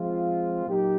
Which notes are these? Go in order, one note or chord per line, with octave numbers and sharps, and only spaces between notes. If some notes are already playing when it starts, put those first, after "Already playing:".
Already playing: F3 G#3 C4 F4
A#2 F#3 A#3 D#4 G4